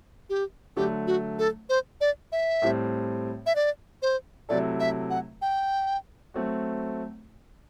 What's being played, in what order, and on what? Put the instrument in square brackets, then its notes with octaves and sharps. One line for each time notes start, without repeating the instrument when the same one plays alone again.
[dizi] G4
[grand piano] D3 F#3 A3 [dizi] G4
[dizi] F#4
A4
C5
D5
E5
[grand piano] A2 G3 C4
[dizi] E5
D5
C5
[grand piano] C3 F#3 A3 E4 A4 [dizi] D5
[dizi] E5
F#5
G5
[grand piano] F#3 A3 C4 F#4